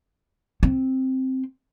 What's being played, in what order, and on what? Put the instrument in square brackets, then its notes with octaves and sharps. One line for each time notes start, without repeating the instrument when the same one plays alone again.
[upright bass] C4